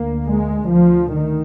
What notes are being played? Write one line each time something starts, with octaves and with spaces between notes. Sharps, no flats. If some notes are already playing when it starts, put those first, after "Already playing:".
Already playing: D2 A#3
G#3
D2 F3
D#3